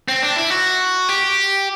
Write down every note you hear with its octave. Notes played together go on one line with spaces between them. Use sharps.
C4
D4
E4
F#4
G4